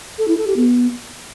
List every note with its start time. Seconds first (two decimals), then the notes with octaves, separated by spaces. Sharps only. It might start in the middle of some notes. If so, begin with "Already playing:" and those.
0.18 A4
0.28 E4
0.38 A4
0.47 G4
0.57 B3